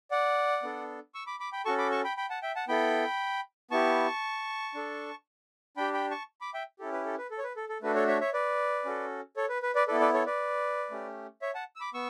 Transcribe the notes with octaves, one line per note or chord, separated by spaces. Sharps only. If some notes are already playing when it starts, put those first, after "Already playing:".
D5 F#5
B3 D4 A4
C#6 E6
B5 D6
B5 D6
G5 B5
C#4 F#4 A4 A5 C#6
B5 D6
A5 C#6
G5 B5
G5 B5
F#5 A5
E5 G5
F#5 A5
B3 E4 A4 G5 B5
B3 E4 G4 A5 C#6
D4 A4
D4 G4 G5 B5
G5 B5
A5 C#6
B5 D6
E5 G5
C#4 E4 G4 A4
B4
A4
B4
A4
C#5
B4
A4
A4
A3 D4 F#4 A4 B4
A4 C#5
C#5 E5
C#5 E5
B4 D5
C#4 F#4 A4
A4 C#5
B4
B4
B4 D5
B3 E4 A4 B4 D5
B4 D5
A4 C#5
B4 D5
A3 C#4 G4
C#5 E5
F#5 A5
E6
B5 D6
B3 C#6 E6